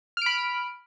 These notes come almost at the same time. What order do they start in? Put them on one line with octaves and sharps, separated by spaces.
F6 D7 B5